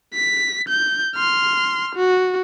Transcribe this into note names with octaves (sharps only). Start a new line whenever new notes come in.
B6
G6
C6 F6
F#4